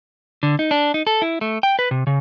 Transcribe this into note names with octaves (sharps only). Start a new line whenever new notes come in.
D3
D#4
D4
D#4
A4
E4
A3
G5
B4
C3
C#3